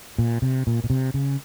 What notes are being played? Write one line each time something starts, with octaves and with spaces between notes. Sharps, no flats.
A#2
C3
A#2
A#2
C3
C#3